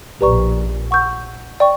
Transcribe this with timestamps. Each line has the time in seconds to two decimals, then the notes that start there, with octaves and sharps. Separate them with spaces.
0.21 A#1 A#2 G4 B4 D5 A#5 C#6
0.91 F#5 C#6 E6 G6
1.60 D5 G5 C#6